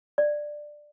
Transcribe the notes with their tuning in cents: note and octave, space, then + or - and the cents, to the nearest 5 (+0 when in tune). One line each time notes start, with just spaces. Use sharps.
D5 +10